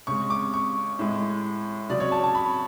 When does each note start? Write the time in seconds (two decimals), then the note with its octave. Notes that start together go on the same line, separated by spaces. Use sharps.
0.07 C#3 G#3 C#6
0.30 D6
0.54 C#6
0.99 A2 G#3
1.90 C#3 F#3 D5
2.00 C#5
2.12 A5
2.24 A5
2.35 B5